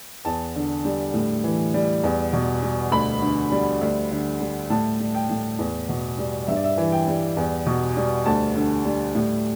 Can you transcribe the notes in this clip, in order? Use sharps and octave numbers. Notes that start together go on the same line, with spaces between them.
E2 A5
D3
G3
A2
E3
G3
E2
B2
G3
D2 B5
D3
G3
D2
D3
G3
A2 A5
G3
G5
A2
E2
B2
G3
G2 E5
D5
E5
E3
G5
G3
E2
B2
G3
D2 A5
D3
G3
A2